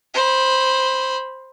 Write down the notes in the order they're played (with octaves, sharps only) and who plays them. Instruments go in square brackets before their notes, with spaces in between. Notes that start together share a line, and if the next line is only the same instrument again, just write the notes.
[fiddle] C5 B5